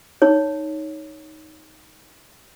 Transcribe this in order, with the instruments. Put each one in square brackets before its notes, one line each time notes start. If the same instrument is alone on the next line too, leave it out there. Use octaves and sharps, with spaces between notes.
[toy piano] D#4 C#5